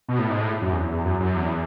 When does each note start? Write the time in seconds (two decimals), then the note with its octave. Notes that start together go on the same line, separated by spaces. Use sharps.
0.08 B2
0.19 A2
0.30 G#2
0.41 A2
0.62 F#2
0.72 E2
1.05 F#2
1.20 F#2
1.36 E2